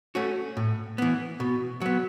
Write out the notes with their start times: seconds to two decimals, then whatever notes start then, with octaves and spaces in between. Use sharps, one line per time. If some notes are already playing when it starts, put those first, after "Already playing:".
0.15 A3 C#4 F#4
0.57 A2
0.98 E3 B3
1.40 B2
1.81 F#3 B3